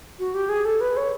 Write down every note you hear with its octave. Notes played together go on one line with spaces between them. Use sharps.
F#4
G4
G#4
A4
B4
C#5